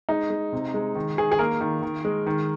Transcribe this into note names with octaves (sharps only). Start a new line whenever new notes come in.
G#3 D#4
G#3
C3
G#3
D#3
D#3 G#4
G#4
A#3 A#4
D#3
D#3
G#3
D#3